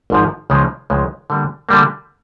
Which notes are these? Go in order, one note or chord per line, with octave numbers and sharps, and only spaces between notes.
G#1 G#2 F3
C#2 C#3 F3 G#3
C#2 C#3 F3 G#3
D3 G3 A#3
D3 G3 A#3